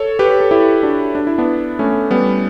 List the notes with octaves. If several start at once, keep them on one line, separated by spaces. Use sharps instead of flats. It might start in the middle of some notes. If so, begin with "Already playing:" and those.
Already playing: A4 C#5
G4 B4
A4
E4 G4
D4 F#4
D4
E4
B3 D4
A3 C#4
G3 B3